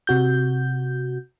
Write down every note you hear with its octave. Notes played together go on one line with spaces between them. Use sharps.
C3 F#4 G6